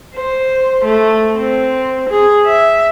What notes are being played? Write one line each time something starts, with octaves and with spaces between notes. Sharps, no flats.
C5
A3
C4
G#4
E5